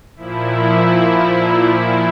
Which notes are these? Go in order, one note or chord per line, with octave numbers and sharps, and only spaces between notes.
A#2 F3 E4